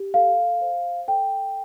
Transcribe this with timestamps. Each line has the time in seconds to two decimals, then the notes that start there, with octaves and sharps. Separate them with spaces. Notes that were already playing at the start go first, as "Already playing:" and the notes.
Already playing: G4
0.14 A4 F5
0.61 C5
1.08 A4 G5